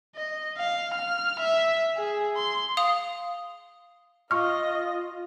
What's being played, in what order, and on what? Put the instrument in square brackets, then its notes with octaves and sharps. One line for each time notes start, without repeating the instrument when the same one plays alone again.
[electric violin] D#5
F5
F6
E5
G#4
C6
[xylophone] F5 D#6 F7
[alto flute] F4 [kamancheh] D#5 F5 [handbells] C#6 F6